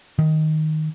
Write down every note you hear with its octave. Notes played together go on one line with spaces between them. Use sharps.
D#3